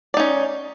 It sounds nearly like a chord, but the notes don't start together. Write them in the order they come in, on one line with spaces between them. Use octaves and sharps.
D5 D#4 C#4